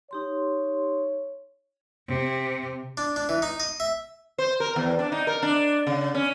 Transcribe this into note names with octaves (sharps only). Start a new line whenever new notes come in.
D#4 G4 C#5 C6
C3
D4
D4
E3
D#4
D#5
E5
C5
A#4
E2
D4
D#4
A#4
D4
C#3
C#4